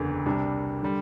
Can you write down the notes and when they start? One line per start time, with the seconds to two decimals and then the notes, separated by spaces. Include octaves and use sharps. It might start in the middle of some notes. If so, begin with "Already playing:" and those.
Already playing: F#1 E2 D3
0.26 C2 C3 G3 D4
0.83 D3 G3